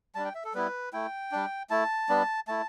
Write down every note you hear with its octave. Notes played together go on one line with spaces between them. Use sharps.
G3 D4 A5
G5
E5
A4
G3 B3 E4 B4
A3 E4 G5
G3 D4
A3 E4 A5
G3 B3 D4
A3 E4 A5